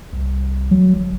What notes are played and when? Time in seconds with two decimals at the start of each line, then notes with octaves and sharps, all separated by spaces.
0.13 C2
0.71 F#3
0.96 G1